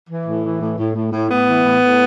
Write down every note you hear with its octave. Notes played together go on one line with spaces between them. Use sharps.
E3
A2
E3
A2
A2
A2
A2
A2 B3
E3
A2
A2